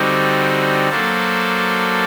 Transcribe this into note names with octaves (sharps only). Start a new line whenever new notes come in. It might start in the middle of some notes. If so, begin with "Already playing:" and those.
Already playing: D3 G3 C4 D#4 F#4
F#3 A#3 D4 A4 C5